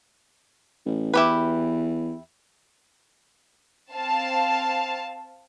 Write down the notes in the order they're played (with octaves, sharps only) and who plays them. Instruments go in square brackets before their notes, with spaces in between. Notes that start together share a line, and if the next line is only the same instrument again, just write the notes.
[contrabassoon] A1
[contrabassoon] E2 [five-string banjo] E4 G4 B4
[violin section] C4 F5 A5